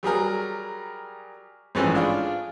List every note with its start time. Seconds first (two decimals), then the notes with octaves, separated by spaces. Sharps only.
0.03 F#3 G3 G#4 A#4
1.75 A1 G#2 E3 F3 C#4 G#4
1.95 D4 F4 G#4 F6